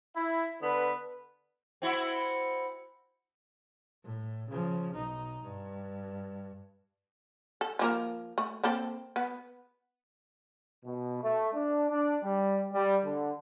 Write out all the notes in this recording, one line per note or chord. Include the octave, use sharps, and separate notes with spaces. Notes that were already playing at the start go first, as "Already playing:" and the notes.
E4
D3 B3 B4
C4 E4 F#4
A2
C#3 F3
B1 D#4
G2
A4
F3 A#3 A#4
A3
A#3 C4 A4
B3
B2
A3
D4
D4
G3
G3
D3